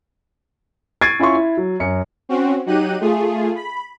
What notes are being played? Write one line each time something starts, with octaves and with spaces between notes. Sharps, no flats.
C#6 G#6 A6 C7 D7 D#7
C#4 E4 F4 C6 C#6
E4
F#3
F#2 C#7
C4 C#4 F#4
F#3 D#4 G4 F#6 D#7
A3 F4 G#4
B5